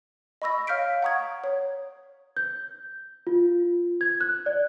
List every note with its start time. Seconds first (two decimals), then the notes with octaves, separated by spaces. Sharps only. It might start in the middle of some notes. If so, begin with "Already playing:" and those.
0.42 D#5 B5 C#6 E6 A#6
0.67 C#5 F5 F6 G6 B6 D7
1.02 F#5 A#5 C#6 D#6 G#6
1.44 C#5
2.37 G6
3.27 F4
4.01 G#6
4.21 F#6
4.46 D5